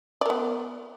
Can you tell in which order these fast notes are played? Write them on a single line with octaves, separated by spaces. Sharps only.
D5 A#4 B3